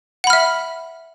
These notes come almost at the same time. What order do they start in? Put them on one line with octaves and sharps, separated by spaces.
F#5 B5 F6 E5